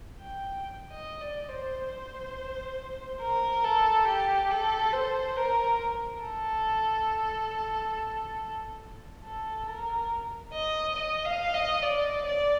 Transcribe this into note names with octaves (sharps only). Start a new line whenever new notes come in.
G5
D#5
D5
C5
A#4
A4
G4
A4
C5
A#4
A4
A4
A#4
D#5
D#5
F5
D#5
D5
D5